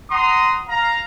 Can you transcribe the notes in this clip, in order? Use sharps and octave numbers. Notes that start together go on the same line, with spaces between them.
F#5 A#5 C6 D#6
F5 A#5